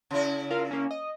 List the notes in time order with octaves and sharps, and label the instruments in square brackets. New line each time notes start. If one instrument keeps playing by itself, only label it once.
[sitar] C#3 E4
[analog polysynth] F4 A#4 F5
A#3 C#4
D#5